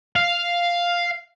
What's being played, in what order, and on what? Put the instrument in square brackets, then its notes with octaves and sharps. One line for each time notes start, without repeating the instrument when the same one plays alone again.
[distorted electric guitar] F5